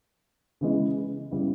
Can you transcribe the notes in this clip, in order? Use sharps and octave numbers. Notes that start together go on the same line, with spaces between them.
C#3 E3 G#3
C#3 G3 B3 E4